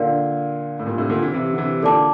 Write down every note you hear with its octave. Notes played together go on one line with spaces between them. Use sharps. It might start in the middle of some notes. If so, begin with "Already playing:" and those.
Already playing: A#2 D3 A#4 D5 F5
A2
G2 A#2
A2 C3
A#2 D3
C3 E3
C3 E3
D3
C3 E3
A#2 D3 A4 D5 A5 D6